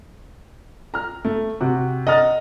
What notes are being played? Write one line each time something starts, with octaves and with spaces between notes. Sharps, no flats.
A#5 F6
A3
C3 F#4
D#5 F#5 A#5 F6 A6